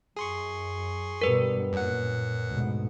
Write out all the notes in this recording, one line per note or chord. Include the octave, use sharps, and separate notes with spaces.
F#2 G#4 C6 C#6
G2 B2 G3 A#4 B4
F#2 A#2 F#5
D2 G#2 B2